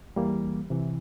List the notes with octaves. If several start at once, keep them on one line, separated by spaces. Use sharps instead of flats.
E2 E3 G3 A#3
C2 C3 E3